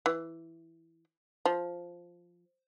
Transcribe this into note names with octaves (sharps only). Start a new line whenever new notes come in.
E3
F3